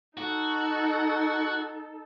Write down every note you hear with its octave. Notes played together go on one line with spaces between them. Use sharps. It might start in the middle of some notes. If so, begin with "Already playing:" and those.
D#4 F#4 A4